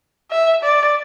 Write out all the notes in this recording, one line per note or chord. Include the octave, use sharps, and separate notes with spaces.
E5
D5